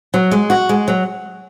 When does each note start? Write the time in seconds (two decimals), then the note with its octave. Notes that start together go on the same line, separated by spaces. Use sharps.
0.14 F#3
0.31 G#3
0.50 F#4
0.69 G#3
0.88 F#3